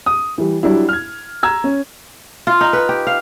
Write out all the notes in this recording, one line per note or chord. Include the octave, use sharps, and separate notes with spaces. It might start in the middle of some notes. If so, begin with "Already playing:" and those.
D#6
E3 G3
F#3 G3 D4 E4
F6 G#6
A#5 E6 G#6
C#4
F4
D#4
B4
G4
F5